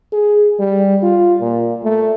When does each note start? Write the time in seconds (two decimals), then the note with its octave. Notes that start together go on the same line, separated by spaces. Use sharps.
0.13 G#4
0.59 G3
1.03 F4
1.41 A#2
1.84 A3